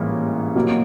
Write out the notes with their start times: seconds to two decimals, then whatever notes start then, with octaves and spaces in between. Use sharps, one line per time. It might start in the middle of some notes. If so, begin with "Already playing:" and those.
Already playing: A1 G#2 E3 G3 A#3
0.55 B2 F#3 A#3